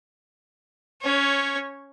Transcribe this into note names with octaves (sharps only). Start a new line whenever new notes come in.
C#4 C#5